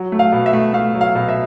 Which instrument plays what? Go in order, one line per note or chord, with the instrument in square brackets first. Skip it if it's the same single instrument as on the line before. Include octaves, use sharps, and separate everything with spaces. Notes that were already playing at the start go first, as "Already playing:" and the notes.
Already playing: [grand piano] F#3
A3
F5
B2
E5
A3
A3 F5
F#3
F5
B2
E5